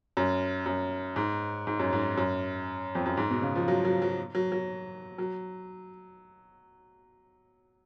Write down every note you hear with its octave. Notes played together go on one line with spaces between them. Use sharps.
F#2
F#2
G#2
G#2
F#2
G#2
F#2
F2
F#2
G#2
B2
C#3
F3
F#3
F#3
F#3
F#3
F#3
F#3